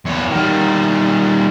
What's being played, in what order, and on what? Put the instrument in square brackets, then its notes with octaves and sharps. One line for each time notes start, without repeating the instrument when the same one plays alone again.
[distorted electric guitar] E2 C#5
D#3 G3